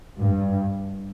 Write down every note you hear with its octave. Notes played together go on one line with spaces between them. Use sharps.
G2